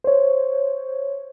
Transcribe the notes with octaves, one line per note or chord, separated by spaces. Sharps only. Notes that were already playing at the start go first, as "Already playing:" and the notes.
C5 C#5